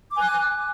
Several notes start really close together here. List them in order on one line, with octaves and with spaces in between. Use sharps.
D6 G#5 F#6